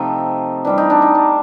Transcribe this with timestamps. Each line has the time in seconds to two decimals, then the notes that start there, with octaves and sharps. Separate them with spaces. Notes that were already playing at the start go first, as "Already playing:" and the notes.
Already playing: C3 F3 A3 C4 D#4
0.65 E3 G3 C4 D4
0.78 D#4
0.90 D4
1.02 D#4
1.15 D4